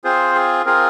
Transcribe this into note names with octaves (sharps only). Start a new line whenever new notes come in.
C4 F4 G#4 C5
G#4
C4 F4 G#4 A#4